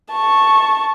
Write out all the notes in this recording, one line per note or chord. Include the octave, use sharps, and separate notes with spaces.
A5 C#6